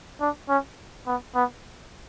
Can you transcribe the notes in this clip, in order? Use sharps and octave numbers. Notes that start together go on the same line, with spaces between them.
D4
C#4
B3
B3